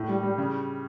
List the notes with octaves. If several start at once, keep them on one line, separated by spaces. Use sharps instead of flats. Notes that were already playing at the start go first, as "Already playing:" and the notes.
Already playing: A2
G3
G3
C#3